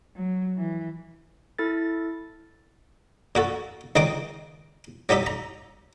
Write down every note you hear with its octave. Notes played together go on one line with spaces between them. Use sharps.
F#3
E3
E4 A4 A6
A#2 F#4 A4
C#2 D#3 D4 D#5 G5 D6
F#3 G3 D#4 G4 E5
A#5